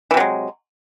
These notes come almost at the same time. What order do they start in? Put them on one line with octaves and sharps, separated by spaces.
E3 C3 F#3 G#3